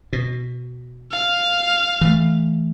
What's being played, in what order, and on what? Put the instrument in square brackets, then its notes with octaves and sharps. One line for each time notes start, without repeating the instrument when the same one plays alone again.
[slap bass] B2
[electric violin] F5
[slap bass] E3 A3